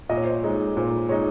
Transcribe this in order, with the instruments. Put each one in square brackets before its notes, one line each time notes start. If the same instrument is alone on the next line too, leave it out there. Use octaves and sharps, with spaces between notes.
[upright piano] A#2 [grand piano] D#5
[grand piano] C#5
C5
C#5
[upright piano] G#3 D#4
[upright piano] A#2 [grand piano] C5
[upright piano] G#3 D#4 [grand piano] C#5